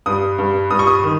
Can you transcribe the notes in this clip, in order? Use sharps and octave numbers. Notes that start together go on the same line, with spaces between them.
G2 D#6
G2
G2 D#6
C#6
D#6
D#3